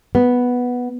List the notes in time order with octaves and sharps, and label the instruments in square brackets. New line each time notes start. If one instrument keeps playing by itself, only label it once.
[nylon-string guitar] B3